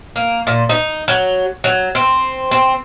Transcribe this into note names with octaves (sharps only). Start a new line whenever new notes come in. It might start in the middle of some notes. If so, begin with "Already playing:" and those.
A#3
A#2
D#4
F#3
F#3
C4
C4